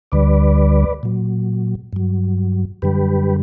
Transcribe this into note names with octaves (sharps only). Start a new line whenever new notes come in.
D2 D3 G3 B4 D5
A#2 F#3
G2 F#3
F#2 D3 G3 G4 B4